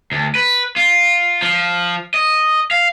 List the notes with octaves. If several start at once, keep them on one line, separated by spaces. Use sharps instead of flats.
D2
B4
F4
F3
D#5
F5